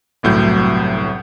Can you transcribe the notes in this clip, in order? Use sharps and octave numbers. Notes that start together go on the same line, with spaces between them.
G1 C2 A2 F#3 G6